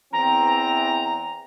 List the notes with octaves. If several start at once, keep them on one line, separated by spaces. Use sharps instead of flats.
E2 E3 C4 A#5